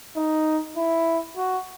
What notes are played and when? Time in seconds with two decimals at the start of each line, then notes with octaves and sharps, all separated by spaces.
0.17 D#4
0.77 E4
1.37 F#4